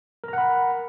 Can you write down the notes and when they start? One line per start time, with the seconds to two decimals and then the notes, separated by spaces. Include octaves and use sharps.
0.24 A#4
0.28 A#5
0.33 F#5
0.38 B5